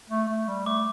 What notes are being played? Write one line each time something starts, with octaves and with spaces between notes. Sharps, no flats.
A3
A3
G3
A3 D6